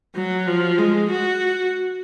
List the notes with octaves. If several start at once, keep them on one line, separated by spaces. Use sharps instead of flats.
F#3
F3
G#3
F#4